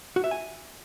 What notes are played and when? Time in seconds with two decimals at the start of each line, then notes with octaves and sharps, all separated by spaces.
0.16 F#4
0.24 E5
0.31 G#5